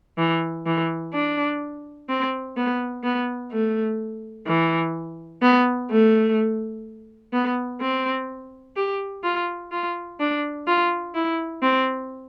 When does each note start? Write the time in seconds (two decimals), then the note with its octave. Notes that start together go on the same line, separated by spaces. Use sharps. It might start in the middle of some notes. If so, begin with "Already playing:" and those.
0.18 E3
0.66 E3
1.13 D4
2.09 C4
2.57 B3
3.04 B3
3.52 A3
4.47 E3
5.42 B3
5.90 A3
7.33 B3
7.81 C4
8.76 G4
9.24 F4
9.72 F4
10.20 D4
10.67 F4
11.15 E4
11.63 C4